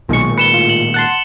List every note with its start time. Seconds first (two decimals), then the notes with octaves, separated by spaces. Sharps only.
0.09 B1 A#2 D#3 G#3 C#6
0.38 B4 C#7 E7 G7
0.54 A2 F4
0.70 F#7
0.94 F#5 A5 C6